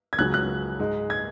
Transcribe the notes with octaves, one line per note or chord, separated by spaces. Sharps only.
G#6
C#2 C#3 F#3 C#4 F#6
F#6
G#2 G#3 D#4
G#6